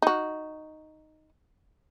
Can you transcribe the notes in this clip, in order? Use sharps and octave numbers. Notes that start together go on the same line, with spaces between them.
D#4 F#4